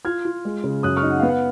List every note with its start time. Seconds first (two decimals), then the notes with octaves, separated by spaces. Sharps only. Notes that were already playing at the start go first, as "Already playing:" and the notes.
0.05 F4 F6 G#6
0.25 F4
0.45 G#3
0.64 C#3
0.83 F#2 D#6 F#6
0.97 C#6 F6
1.03 D#4
1.10 F#5
1.20 B3 F5
1.29 F#5